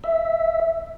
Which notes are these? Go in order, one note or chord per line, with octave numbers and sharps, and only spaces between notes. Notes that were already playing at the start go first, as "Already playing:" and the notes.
E5